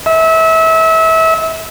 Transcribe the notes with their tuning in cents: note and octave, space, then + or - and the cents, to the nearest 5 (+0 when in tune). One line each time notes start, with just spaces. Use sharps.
E5 -30